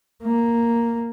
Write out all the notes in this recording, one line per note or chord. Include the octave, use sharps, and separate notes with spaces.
A#3